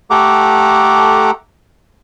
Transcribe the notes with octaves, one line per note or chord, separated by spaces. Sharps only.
A3 G4 A4 F#5 A#5 D6